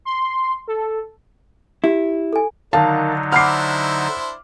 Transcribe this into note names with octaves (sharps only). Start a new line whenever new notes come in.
C6
A4
E4 G4
A4 G#5
D3 D#3 F#3 D#4 F5 A5
D4 E4 C5 F#5 B5 D6 F6 C7